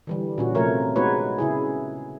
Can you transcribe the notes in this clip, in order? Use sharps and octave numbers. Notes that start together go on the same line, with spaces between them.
D3 E3 G3
A#2 C#4 F#4
C3 F3 A3 A#4 C#5
G#3 B3 D#4 F#4 B4 C#5
C#3 E4 G#4